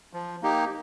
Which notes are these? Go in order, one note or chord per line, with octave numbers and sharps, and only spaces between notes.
F3
A#3 D#4 G4